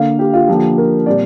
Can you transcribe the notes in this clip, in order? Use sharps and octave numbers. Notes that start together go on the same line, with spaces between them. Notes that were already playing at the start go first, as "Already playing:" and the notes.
Already playing: D3 A#3 F5
G4
F4
D3 F3 A#3 G4
A#4
A#2 G3 C4 D5